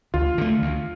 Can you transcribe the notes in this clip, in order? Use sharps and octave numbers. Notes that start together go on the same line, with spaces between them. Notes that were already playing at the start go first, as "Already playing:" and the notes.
D2 F4
D3 A3
D2